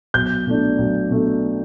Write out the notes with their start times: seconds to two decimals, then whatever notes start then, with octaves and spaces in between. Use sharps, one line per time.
0.14 B1 G6
0.46 B2 A3 D4
0.78 B1
1.11 B2 A3 D4